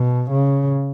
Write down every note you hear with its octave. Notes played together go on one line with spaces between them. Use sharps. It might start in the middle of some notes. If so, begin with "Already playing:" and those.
Already playing: B2
C#3